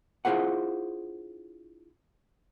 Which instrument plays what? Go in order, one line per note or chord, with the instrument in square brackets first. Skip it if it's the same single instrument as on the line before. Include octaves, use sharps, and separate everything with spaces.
[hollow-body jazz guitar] D4 E4 F4 G#4 C5 F#5